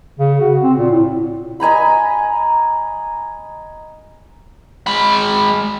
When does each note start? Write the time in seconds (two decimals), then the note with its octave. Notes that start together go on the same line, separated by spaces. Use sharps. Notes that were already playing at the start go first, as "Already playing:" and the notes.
0.19 C#3
0.40 F#4
0.63 C4
0.78 A#2
0.91 A2
1.60 D#5 G#5 A#5 B5
4.87 G#3 B5